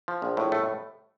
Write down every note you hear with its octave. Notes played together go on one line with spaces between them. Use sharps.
F3
A#1
A2
A3